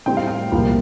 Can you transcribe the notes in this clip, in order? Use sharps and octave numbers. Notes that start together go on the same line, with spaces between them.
A2 G3 C4 G5
F5
G5
C2 A#2 F3 A#3